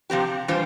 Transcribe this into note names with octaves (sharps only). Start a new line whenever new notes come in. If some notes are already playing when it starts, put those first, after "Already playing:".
C3 F3 C4 G4
E3 G3 D4 F4 C5